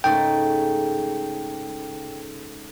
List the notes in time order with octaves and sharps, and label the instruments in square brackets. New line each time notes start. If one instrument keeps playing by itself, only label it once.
[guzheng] G#2 C#3 A3 [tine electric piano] G5